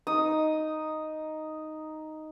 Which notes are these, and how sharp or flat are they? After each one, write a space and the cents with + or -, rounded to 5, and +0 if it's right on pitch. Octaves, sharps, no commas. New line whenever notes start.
D#4 +0 D#6 +0